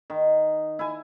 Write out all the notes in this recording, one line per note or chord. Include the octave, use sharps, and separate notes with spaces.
D#3
E4 G#5